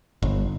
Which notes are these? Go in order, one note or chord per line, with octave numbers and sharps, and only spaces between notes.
G1